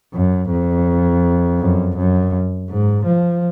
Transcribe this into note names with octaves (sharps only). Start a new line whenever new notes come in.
F#2
F2
F#2
F#2
G#2
F3